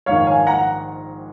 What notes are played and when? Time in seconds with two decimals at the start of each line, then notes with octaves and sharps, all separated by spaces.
0.06 A#1 G#2 D#3 C#5 F5
0.27 F5 G#5
0.47 F#5 A#5